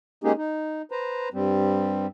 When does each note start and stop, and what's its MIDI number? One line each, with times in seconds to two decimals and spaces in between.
0.24 0.32 56
0.24 0.32 58
0.24 0.32 61
0.24 0.32 63
0.24 0.32 67
0.24 0.32 68
0.37 0.82 63
0.91 1.29 71
0.91 1.29 72
0.91 1.29 82
1.34 2.07 43
1.34 2.07 55
1.34 2.07 60